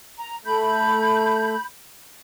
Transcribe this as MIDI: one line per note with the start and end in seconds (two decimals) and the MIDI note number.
0.18 0.37 82
0.45 1.55 57
0.45 1.64 83
0.45 1.64 91